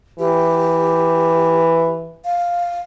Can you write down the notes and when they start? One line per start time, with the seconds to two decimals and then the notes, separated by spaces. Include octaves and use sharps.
0.19 E3 G4
2.24 F5